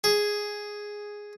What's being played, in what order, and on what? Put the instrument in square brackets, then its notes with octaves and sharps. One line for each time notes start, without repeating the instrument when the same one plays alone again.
[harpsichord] G#4